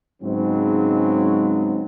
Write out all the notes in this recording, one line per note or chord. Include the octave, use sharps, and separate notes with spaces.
G#2 C#3 F#3 G#3 B3 C4